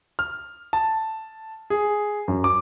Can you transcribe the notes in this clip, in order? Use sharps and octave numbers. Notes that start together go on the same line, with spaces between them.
F6
A5
G#4
F#2
D6